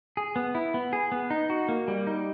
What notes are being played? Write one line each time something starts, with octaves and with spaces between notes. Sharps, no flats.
G#4
B3
E4
B3
G#4
B3
D#4
F#4
A#3
G3
D#4